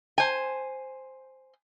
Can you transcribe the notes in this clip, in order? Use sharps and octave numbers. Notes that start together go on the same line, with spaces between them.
C5 G#5